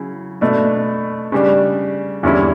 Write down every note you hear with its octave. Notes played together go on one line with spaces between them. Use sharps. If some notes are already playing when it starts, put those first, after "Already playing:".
Already playing: C#3 F#3 C#4 E4
B2 A3 D4
C#3 G3 D4
E2 D3 G3 C#4 E4